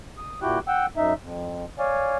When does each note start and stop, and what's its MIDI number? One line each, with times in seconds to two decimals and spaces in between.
0.17 0.40 87
0.42 0.59 46
0.42 0.59 64
0.42 0.59 66
0.42 0.59 67
0.42 0.59 79
0.42 0.59 90
0.68 0.86 78
0.68 0.86 79
0.68 0.86 88
0.97 1.14 42
0.97 1.14 63
0.97 1.14 76
1.22 1.65 41
1.79 2.18 73
1.79 2.18 74
1.79 2.18 77
1.79 2.18 80